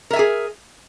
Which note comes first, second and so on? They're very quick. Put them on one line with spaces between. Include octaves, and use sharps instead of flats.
A#4 E5 G#5 G#4